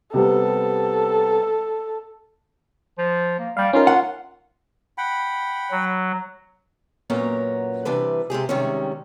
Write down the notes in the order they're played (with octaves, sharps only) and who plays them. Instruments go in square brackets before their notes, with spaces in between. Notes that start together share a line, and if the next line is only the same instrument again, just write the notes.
[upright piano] C3 G3 B3 [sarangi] A4
[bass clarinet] F3
A#3
[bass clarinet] G3 [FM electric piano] F5 G5
[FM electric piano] C#4 D#4 A#4 [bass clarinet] F4
[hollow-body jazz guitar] F#5
[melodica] F#5 G5 B5
[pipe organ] F#3
[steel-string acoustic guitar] F#2 A#2 B3 C#4 A#4 A#5
C3 E3 G3 D4 B4
C3 G#3 G4 G#4
C3 D#3 G3 G#3 C#4